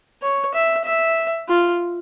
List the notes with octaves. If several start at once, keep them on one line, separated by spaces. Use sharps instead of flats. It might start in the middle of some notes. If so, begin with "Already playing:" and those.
C#5
E5
E5
F4